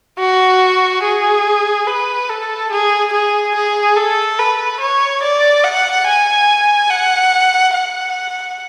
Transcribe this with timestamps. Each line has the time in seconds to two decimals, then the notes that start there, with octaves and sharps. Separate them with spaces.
0.19 F#4
1.03 G#4
1.87 B4
2.30 A4
2.71 G#4
3.13 G#4
3.55 G#4
3.96 A4
4.39 B4
4.80 C#5
5.23 D5
5.64 F#5
6.07 G#5
6.90 F#5
7.74 F#5